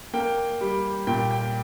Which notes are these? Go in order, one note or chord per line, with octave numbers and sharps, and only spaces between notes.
A#3 G5
G3
A#2 G5
G5